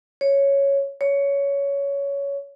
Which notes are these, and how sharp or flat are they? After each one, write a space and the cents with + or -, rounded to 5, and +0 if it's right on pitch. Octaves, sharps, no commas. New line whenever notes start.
C#5 +0
C#5 +15